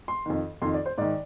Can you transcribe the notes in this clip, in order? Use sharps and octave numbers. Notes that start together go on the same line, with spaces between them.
C6
F2 D#3
F2 D#3 C6
D5
C5
G#2 D#3 D5